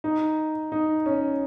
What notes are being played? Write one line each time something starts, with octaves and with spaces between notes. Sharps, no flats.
D#4
D#4
C#4